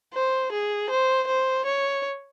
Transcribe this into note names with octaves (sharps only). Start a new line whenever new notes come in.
C5
G#4
C5
C5
C#5